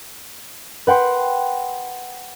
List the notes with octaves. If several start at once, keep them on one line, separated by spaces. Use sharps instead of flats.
B4 F#5 G5 C6